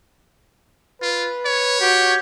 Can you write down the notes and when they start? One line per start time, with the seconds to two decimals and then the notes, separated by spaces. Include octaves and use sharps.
1.02 F4 B4
1.46 C#5
1.81 F#4 G4